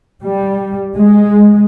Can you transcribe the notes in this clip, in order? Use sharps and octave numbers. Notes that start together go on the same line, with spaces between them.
G3
G#3